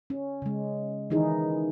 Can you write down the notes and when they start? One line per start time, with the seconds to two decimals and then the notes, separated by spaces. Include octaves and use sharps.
0.10 C#4
0.42 C#3 G#3
1.10 D#3 E3 D#4 E4 G#4